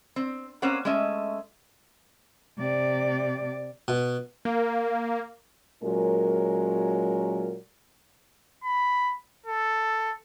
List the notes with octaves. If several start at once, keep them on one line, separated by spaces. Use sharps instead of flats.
C4
A#3 C4 C#4 C5 C#5 F#5
G#3 A3 C#4 D#5 E5
C3 D5
B2
A#3
A#2 F#3 G#3 C#4 A#4
B5
A4